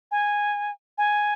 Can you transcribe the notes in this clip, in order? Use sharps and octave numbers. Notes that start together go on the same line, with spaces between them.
G#5
G#5